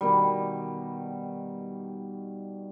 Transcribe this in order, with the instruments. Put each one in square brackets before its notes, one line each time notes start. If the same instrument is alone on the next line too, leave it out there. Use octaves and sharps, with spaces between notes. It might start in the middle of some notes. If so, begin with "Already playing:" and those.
[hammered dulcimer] B2 D#3 G3